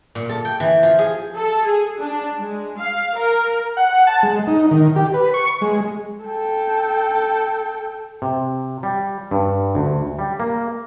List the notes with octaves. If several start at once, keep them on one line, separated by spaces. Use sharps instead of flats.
A#2
A4
G5
E3
F3
G#4
A4
G#4
D4
G#3
F5
A#4
F#5
A5
G#3
D#4
D#3
G4
B4
C#6
G#3
A4 G5
C3
G3
G2
D2
G3
A#3